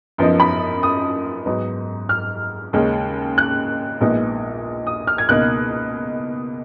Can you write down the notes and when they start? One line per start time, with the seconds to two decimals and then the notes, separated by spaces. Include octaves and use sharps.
0.18 F#2 F3 B3 D#4
0.40 B5
0.83 D#6
1.46 G#2 F#3 B3 D#4
2.09 F6
2.73 D#2 C#3 G#3 C#4
3.38 F#6
4.01 A#1 A#2 G#3 B3 D#4
4.87 D#6
5.07 F6
5.18 G#6
5.28 C#2 B2 A#3 D#4 F#6